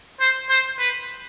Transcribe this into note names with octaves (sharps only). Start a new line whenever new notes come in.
C5
C5
B4